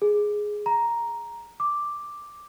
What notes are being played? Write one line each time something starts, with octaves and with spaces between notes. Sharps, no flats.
G#4
A#5
D6